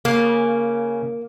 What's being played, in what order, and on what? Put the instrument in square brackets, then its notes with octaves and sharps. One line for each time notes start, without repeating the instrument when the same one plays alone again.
[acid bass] C#3 [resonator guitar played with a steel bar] A#3